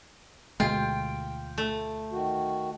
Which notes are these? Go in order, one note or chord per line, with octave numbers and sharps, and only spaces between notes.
D2 B2 G#3 F4 G5
A3
D#3 F#4